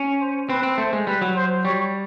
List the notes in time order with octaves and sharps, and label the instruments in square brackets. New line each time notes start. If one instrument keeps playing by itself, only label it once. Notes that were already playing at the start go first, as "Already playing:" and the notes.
Already playing: [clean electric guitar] C#4
[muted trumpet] C5
[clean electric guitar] C4 [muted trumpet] B4
[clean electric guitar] C4
[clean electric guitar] A3 [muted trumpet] C5
[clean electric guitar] G#3
[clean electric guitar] G3 [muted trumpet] B4
[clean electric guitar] F#3
[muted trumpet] C5
[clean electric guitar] G3 [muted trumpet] C#5